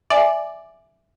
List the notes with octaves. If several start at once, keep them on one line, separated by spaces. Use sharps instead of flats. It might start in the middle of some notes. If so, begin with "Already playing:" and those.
D5 E5 G#5